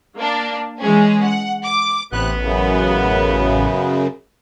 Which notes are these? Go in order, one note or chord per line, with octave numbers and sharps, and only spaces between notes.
A#3 D4
E3 G#3 C#4 G#4
F#5
D6
A1 C3 B3 F#6
F#2 C#3